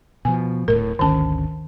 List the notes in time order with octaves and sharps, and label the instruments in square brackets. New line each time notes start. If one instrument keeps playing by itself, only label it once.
[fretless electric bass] B2 F3 [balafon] G#5
[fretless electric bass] D1 G#1 A2 [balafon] A#4
[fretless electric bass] G#1 D2 C#4 [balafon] D#3 A5